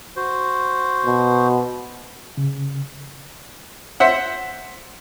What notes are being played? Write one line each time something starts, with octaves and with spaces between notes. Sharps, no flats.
F#4 C5
B2
C#3
C5 E5 F#5